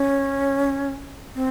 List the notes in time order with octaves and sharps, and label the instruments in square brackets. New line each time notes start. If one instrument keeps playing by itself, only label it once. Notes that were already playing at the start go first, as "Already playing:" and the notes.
Already playing: [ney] C#4
C4